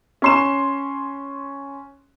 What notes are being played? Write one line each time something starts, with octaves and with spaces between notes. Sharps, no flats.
C#4 C6 E7